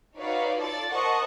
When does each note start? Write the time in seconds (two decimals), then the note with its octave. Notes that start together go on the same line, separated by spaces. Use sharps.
0.18 D#4 F#4 B4 C#5 D5 F5
0.60 F4 A4 D5 A6
0.92 A#4 C5 D#5 F#5 A5 C#6